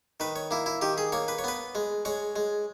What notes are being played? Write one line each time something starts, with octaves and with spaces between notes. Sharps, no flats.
D#3 B4
C#5
A#3 E4
E4
D#3 G4
G#4
A#3 C#5
B4
C#5
B3 B4
G#3
G#3 C#5
G#3